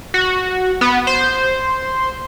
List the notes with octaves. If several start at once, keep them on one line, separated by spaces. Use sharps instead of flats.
F#4
B3
C5